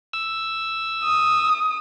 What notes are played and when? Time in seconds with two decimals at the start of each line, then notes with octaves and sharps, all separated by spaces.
0.13 E6
1.04 D#6